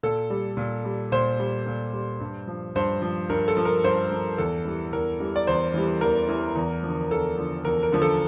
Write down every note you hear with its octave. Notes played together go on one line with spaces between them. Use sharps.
A#2 A4
G3
A#2
G3
A#2 C5
G3
A#2
G3
G2
F3
G2 C5
F3
G2 A#4
A4
F3
A#4
G2 C5
F3
E2 A4
E3 G3
E2 A#4
E3 G3
D5
E2 C5
E3 G3
E2 A#4
E3 G3
E2
D3 F3
E2 A4
D3 F3
E2 A#4
A#4
D3 F3
A4